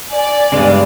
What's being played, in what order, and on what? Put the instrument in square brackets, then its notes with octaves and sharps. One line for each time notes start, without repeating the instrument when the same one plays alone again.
[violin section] D5 [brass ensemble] G#5
[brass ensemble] G2 [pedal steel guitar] C#3 G#3 B3